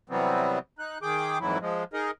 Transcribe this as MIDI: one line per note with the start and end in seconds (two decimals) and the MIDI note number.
0.09 0.59 48
0.09 0.59 52
0.09 0.59 54
0.09 0.59 55
0.09 0.59 59
0.09 0.59 60
0.79 0.98 63
0.79 0.98 90
1.02 1.38 51
1.02 1.38 68
1.02 1.38 79
1.02 1.38 86
1.40 1.58 41
1.40 1.58 44
1.40 1.58 52
1.40 1.58 54
1.40 1.58 64
1.61 1.84 53
1.61 1.84 56
1.93 2.11 63
1.93 2.11 68
1.93 2.11 70
1.93 2.11 75